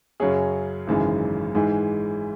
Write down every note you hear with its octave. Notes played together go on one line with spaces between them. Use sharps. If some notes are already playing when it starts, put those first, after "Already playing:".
F#2 C#3 F#3 C#4 G#4
G#1 F#2 C#3 E3 G#3
G#2 E3 G#3